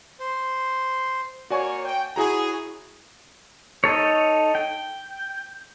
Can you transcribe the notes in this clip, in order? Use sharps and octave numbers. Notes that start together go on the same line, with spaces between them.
C5
A#3 F#4 C#5 D5 G#5
G5
E4 F#4 G#4 C#5 A#5
D#4 A4 C#5
G5